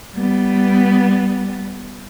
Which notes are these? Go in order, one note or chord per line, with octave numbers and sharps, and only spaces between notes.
G3 B3